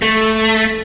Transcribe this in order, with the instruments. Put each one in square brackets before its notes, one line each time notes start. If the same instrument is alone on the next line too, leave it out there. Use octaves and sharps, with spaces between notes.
[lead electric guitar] A3